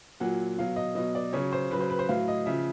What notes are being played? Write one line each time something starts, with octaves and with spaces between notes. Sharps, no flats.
A#2 F#3 F#5
B2 F#3 F5
D#5
B2 F#3 D#5
D5
C#3 F#3 C#5
C5
C#3 F#3 B4
C5
B4
C5
A2 F#3 F5
D#5
C#3 F3 E5